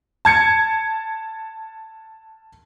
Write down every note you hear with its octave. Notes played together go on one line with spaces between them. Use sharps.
A5 G#6 C#7